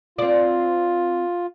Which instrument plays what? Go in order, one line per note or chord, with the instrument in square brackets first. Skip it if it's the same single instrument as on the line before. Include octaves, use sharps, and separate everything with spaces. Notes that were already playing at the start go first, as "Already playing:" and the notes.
[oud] C4 D5 [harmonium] F4